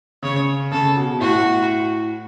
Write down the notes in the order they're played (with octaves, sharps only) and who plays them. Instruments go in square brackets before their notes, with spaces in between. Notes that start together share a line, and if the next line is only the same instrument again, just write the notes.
[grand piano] C#3 [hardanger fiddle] C#5
[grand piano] C#3 [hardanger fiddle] A4
[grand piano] B2
[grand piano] A2 [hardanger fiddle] F#4